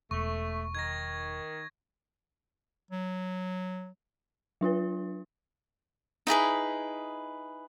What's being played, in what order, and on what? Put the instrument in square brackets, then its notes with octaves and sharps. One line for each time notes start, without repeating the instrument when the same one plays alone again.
[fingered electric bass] E1 [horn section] A3 [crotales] C#6
[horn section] D#3 [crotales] G#6 A#6
[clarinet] F#3
[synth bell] F#3 D4 F4 B4
[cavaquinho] D#4 E4 G#4 B4